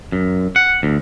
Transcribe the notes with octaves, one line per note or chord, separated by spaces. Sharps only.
F#2
F#5
D2